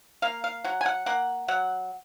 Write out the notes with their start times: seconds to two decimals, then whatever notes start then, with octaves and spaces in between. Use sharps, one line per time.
0.22 A#3 F5
0.44 F5
0.64 F#3 F#5
0.81 G#5
0.86 F#5
1.06 A#3 F#5
1.48 F#3 F#5